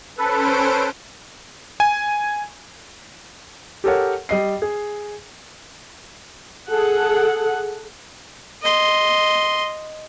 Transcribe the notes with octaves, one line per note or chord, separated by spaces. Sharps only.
C#4 A4 B4 C5 D7
G#5
G4 A4 A#4 C#5 F#5
G3 D#5 C7
G#4
G#4 A4 F#5
D#5 C6